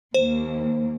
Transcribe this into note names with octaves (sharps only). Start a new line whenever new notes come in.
D#2 A#3 C5